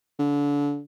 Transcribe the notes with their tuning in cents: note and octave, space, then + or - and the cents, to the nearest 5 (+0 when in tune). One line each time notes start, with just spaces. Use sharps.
D3 -30